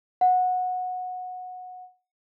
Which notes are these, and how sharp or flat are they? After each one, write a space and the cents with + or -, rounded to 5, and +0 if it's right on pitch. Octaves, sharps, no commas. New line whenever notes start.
F#5 -15